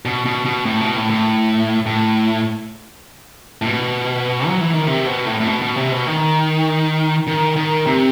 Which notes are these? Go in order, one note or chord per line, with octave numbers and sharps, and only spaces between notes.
B2
B2
B2
A2
B2
A2
A2
A2
A2
B2
F#3
E3
D#3
C3
B2
A2
A2
B2
B2
C3
B2
D#3
D#3
D#3
C3